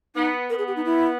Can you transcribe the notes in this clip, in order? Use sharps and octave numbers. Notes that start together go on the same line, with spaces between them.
B3 D#4
B3 A#4
G#4
G4
D#4
E4